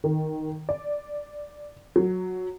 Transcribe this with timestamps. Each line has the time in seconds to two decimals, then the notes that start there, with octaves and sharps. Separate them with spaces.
0.04 D#3
0.69 D5
1.96 F#3